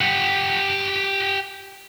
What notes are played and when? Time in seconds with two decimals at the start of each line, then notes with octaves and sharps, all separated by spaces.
0.01 G4 F#5